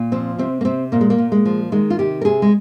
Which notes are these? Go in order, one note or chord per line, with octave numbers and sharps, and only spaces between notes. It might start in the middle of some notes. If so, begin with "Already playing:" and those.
Already playing: A#2
F3 C4
C3 C4
A#3
C3 C4
A#2 A#3
G#3
A#3
A#2
G#3
F3
D#3 G#3
F4
C3 G4
A#4
C3 G#4
G#3